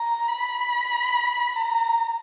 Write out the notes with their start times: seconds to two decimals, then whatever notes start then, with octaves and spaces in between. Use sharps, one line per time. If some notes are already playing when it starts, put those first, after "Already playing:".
Already playing: A#5
0.27 B5
1.56 A#5